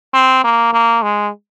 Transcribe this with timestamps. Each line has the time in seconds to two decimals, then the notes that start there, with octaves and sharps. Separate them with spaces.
0.14 C4
0.44 A#3
0.73 A#3
1.02 G#3